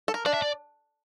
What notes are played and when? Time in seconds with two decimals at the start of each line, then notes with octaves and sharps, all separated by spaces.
0.08 A4
0.14 A#4
0.26 D4 D5
0.34 E5
0.42 D5